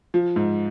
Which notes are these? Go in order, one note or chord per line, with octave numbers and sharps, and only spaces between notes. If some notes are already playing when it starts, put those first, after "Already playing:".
F3
G#2